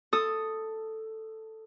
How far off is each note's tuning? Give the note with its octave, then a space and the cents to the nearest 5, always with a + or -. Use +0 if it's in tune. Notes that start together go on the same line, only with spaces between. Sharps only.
A4 +5 D#6 +0